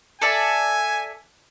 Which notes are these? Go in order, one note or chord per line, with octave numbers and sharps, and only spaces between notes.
A4 D5 E5 G#5